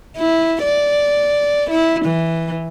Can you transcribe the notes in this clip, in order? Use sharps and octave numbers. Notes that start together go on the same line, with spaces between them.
E4
D5
E4
E3